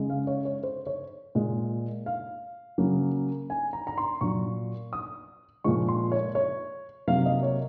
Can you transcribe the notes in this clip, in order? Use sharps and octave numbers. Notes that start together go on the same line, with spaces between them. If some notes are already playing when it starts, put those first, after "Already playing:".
Already playing: C#3 G#3
F5
C#5
C#5
C5
C#5
A#2 G#3
F5
C#3 F#3 A#3
G#5
A#5
A#5
C6
A#2 F#3 A#3 C#6
D#6
A#2 F3 G#3 C#6
C6
C#5
C#5
C3 F#3 A#3 F5
D#5
C#5